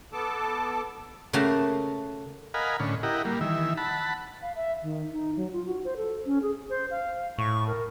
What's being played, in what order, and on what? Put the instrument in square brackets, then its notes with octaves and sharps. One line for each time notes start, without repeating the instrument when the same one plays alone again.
[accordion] B3 A4 A5 D6
[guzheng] C#3 A3 A#3 F#4 A5 A#5
[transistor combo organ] A#4 D#5 F5 F#5 G#5 B5
A2 D3 C#4
E4 G4 A#4 D#5 F#5
G3 A#3
D#3 E3 E5
F#5 A5 B5
[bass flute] F5
E5
D#3
D#4
F#3
F4
F#4
C5
A4
C#4
G#4
[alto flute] C5
F5
[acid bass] A2 [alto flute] C#6
[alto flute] A#4